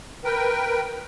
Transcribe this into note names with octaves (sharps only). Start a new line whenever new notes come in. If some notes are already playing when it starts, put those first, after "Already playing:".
A#4 B4 G5